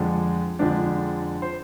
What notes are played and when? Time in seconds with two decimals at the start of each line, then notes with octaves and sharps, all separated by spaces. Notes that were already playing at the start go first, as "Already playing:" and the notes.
Already playing: F2 D3 F3 G#3 D4
0.59 F2 D3 F3 G#3 D4
1.42 C5